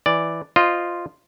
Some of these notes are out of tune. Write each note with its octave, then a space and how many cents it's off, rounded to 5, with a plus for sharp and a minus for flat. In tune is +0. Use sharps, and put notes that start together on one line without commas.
E3 +0 D5 +0
F4 +0 C5 +0 D#5 -10